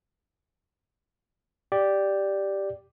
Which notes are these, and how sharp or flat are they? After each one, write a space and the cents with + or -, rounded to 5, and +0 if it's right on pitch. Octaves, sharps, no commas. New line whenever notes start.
G4 +0 D5 +0